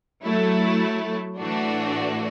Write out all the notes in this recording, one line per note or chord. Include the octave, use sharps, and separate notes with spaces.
F#3 A3 E4
A2 E3 A3 D4 F#4